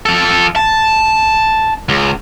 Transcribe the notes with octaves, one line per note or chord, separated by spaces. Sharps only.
F3 A4
A5
C#2